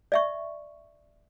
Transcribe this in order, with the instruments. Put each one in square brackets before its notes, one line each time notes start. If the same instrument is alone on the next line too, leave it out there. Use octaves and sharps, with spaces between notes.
[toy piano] D5 E5 C#6